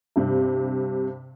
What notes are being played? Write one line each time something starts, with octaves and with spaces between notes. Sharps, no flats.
G2 C3